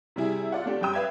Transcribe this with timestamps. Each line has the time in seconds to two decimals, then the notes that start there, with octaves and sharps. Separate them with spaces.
0.16 C3 G3 E4 G#4
0.52 F4 D5 F#5
0.66 A3 D4 G4
0.81 F#2 G3 G5 D#6
0.93 B4 D5 E5 F5 G5 G#6